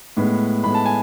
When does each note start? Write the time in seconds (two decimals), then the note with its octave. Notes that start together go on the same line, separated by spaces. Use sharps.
0.17 A2 G#3 B3
0.64 A2 G#3 B3 B5
0.74 A5
0.85 G#5